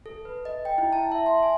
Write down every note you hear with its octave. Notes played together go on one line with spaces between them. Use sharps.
A4
B4
D#5
G5
E4
A5
E5
C6
G#5